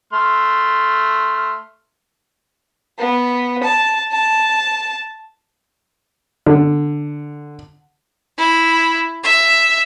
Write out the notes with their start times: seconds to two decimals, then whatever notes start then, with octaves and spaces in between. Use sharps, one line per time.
0.13 A3 C6 F6
2.99 B3
3.63 A5
4.11 A5
6.46 D3
8.38 E4
9.24 E5